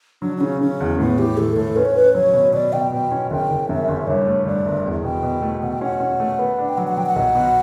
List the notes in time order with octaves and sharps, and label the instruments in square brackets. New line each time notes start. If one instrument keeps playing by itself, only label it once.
[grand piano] F#3 [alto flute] D4
[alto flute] D4
[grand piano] C#3 [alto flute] C#4
[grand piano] C#3 [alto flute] C#4
[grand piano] E2
[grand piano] A2 [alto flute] B3
[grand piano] E3 [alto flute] G4
[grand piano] A2 [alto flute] A4
[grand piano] A2 [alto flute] A4
[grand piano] C#4 [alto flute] B4
[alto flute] C#5
[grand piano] C#4 [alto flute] B4
[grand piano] F#3 [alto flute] C#5
[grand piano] B2
[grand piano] B2 [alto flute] D5
[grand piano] B2 [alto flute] G5
[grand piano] B2 [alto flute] G5
[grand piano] C#4
[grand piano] F#1 [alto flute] G5
[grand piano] F#1
[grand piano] F#2 [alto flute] E5
[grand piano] F#1
[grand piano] G2 [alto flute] C#5
[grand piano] A3
[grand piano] G2 [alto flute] D5
[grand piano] G1
E2
[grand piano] B2 [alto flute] G5
[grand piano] B2
A3
[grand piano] B2 [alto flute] F#5
[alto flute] G5
[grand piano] C#4 [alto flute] F#5
[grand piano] C#4
A3
B3
D4
[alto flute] G5
[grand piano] F#3 [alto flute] F#5
[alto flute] F#5
[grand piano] F#3 [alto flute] G5
[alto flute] F#5
[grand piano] B1
B2